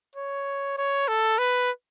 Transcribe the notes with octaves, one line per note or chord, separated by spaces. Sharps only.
C#5
C#5
A4
B4